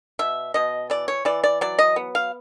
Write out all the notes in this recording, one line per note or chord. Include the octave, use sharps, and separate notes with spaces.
B2 E5
B2 D#5
E3 D5
C#5
E3 D5
D5
F#3 D5
D#5
B3
F5